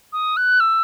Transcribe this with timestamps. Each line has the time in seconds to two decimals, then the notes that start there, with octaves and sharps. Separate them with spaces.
0.13 D#6
0.37 F#6
0.60 E6